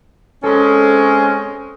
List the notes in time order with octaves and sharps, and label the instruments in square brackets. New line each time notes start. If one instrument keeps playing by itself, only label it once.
[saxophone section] G#3 C4 C#4 [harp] A4 B5